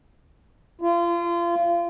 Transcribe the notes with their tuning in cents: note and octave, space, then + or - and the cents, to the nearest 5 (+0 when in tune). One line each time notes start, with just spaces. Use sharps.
F4 -30